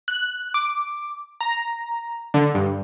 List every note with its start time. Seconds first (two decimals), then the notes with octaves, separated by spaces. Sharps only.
0.08 F#6
0.54 D6
1.41 A#5
2.34 D3
2.55 G2